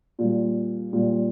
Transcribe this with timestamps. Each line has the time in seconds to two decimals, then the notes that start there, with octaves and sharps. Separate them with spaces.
0.19 A#2 G3
0.93 A#2 G3